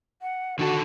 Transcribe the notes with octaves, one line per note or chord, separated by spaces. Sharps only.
F#5
D3 D#3 F#4 A4